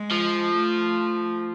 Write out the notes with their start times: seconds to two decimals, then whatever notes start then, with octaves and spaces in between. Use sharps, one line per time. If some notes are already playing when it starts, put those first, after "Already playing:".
Already playing: G#3
0.12 F3
0.54 A3